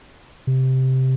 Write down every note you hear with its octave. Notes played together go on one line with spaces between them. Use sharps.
C3